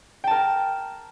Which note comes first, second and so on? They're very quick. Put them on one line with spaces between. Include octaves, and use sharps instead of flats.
G5 A5 A#4